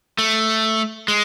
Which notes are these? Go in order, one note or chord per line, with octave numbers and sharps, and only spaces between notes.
A3
G#3